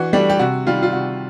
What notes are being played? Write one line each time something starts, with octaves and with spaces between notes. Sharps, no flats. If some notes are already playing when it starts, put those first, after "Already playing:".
Already playing: E3 D4 F#4
G3 A3 D4 G4
G4
C3 F#4
D#3 G3 F4
F4
C3 F#4